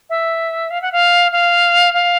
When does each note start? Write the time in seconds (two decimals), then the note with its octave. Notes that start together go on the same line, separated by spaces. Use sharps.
0.10 E5
0.70 F5
0.82 F#5
0.92 F5
1.32 F5
1.94 F5